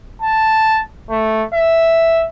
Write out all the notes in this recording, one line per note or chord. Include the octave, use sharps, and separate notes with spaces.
A5
A3
E5